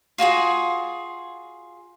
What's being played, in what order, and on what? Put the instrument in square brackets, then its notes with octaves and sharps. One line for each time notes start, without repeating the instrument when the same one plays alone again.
[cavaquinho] F4 F#4 G#4 G#5